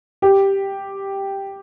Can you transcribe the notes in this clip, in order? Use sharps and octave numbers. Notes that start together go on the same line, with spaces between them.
G4